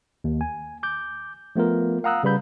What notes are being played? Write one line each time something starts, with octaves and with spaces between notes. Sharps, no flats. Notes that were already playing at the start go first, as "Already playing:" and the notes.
D#2
G#5
D6 G6
F3 A3 B3 F4 A#4
F5 F#5 A#5 D#6 E6 F#6
C#3 G3 B4 B5 G6